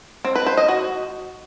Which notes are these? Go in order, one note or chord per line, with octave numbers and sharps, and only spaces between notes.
C4
B4
C5
D#5
F#4